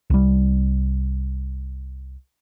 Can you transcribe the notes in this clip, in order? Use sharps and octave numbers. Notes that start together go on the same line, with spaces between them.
C2 G3